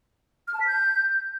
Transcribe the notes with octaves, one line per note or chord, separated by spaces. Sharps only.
F6
A5
B6
G6